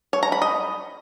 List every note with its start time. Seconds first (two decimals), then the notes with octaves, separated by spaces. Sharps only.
0.13 C#5
0.23 A#5
0.32 B5
0.42 D#5